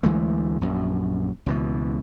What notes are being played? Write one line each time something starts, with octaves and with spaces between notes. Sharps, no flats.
D2 E3 G#3 A3
A#1 F#2
C#2 B2 E3